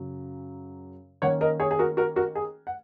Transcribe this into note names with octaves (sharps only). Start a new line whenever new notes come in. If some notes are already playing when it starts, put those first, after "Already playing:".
Already playing: F#2 C#3 F#3
D#3 A#3 C#4 C#5 F#5
A#4 D#5
G#4 C#5
G#4
F#4 A#4
F#4 A#4
F#4 A#4
G#4
F#5